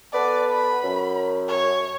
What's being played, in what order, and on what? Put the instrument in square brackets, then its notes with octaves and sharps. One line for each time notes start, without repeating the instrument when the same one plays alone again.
[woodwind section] B3 A4 B4 [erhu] D5
[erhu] B5
[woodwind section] F#2
[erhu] C#5